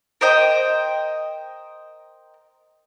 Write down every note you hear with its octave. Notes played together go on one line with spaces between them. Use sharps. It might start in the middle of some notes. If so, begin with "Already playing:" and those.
A#4 C5 D#5 G5